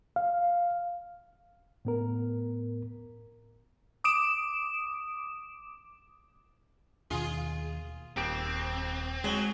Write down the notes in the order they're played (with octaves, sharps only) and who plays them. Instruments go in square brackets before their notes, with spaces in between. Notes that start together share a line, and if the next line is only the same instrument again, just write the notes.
[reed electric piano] F5
A2 B3 A#4
[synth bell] D6 D#6 D7 E7
[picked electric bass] D#2 B2 D#3 [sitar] F4 G#4
[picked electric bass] D#1 [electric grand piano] D#2 G4 D7 [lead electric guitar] C4
[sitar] F#3 [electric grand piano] G#3